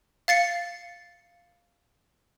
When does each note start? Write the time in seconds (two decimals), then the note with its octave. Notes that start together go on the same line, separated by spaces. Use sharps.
0.28 F5 A6 C7 C#7